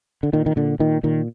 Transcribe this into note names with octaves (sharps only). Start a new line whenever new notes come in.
D3
A#2 D#3
D#3
A#2 D3
A#2 D#3
A#2 D#3